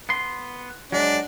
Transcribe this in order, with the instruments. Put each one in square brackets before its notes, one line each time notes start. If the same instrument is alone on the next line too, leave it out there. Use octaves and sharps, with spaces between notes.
[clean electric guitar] B3 C6
[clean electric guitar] F#3 G#3 [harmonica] D4